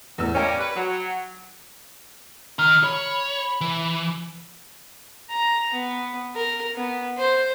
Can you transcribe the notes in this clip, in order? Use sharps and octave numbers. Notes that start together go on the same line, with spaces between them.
E2 A2 E6
G3 A#3 C#4 C#5 G5
B4
F#3
D#3 A#5 F6
C#5 B5
E3
A#5
B3
A#4
B3
C5